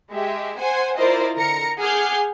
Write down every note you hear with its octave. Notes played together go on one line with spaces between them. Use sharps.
G#3 G4 E5
C5 F#5 G#5
E4 F4 A#4 C5 D5 D#5
D3 A#4 A#5 A#6 C#7
G#4 F#5 G#5 D6 F6 G6